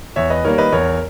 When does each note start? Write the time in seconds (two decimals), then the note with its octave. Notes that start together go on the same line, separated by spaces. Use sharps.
0.16 E2 C#5 E5
0.30 B4 D#5
0.44 D#3 G3 A#3 A#4 C#5
0.58 B4 D#5
0.72 E2 A#4 C#5